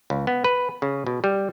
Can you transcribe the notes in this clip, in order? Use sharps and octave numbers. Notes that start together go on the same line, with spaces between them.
C#2
B3
B4
C#3
B2
G3